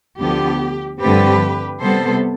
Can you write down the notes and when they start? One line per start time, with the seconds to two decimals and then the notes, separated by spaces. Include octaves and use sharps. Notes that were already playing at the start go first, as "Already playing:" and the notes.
0.19 D2 D3 F3 B3 G4
1.00 G2 D3 F3 A3 C4 G4 B4
1.81 C3 G3 B3 A4 C5